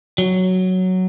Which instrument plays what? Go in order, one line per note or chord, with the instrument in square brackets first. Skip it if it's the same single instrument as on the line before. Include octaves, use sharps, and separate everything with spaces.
[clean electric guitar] F#3